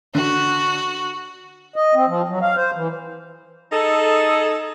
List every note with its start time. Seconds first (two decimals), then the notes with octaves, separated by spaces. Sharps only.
0.15 D3 F#4
1.76 D#5
1.95 C4
2.08 F3
2.29 F#3
2.42 F5
2.56 C5
2.75 E3
3.71 D#4 G#4 A4